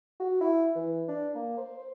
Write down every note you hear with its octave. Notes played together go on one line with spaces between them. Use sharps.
F#4
E4
E3
D4
A#3
C5
C5